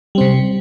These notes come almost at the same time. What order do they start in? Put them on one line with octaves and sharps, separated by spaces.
G3 C4 C3